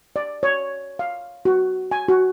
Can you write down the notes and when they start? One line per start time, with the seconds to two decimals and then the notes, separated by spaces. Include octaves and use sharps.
0.16 D5
0.43 C#5
0.99 F5
1.45 F#4
1.91 G#5
2.08 F#4